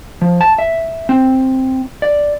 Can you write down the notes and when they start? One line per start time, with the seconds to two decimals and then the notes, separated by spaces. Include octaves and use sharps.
0.21 F3
0.41 A5
0.58 E5
1.09 C4
2.02 D5